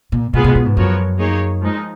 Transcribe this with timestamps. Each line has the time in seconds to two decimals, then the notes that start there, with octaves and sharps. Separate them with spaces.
0.12 A#2
0.33 B2 G#3 B3 F4 G#4 B4
0.44 B2
0.55 B2
0.66 G#2
0.76 F#2 F3 B3 F#4 A#4 C#5
1.19 A#3 D#4 G#4 C#5
1.62 F3 G#3 D#4